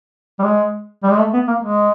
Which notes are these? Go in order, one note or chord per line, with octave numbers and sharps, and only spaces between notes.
G3
G#3
G3
G#3
A3
B3
A#3
G#3